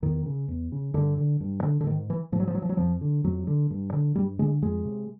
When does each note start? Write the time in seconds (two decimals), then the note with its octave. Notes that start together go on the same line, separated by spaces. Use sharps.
0.02 E2 D#3
0.26 C#3
0.48 E2
0.72 C#3
0.94 G2 D3
1.17 D3
1.40 G2
1.63 D3
1.81 D3
1.86 G#2 D#3
2.10 E3
2.32 G#2 F3
2.40 F#3
2.47 F3
2.55 F#3
2.62 F3
2.69 F#3
2.77 F2 F3
3.01 D3
3.24 F2 F#3
3.47 D3
3.70 G2
3.93 D3
4.15 G2 G3
4.39 D3 G#3
4.62 F2 G#3
4.85 C3